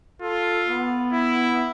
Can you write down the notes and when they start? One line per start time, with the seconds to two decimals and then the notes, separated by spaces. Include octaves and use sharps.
0.22 F4 A4
0.69 B3
1.13 E4